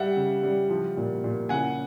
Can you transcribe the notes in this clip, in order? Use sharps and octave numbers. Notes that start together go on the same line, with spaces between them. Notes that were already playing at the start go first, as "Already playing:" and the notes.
Already playing: G3 E5 F#5
C#3
G3
F3
A#2
A#2
C#3 F#5 G#5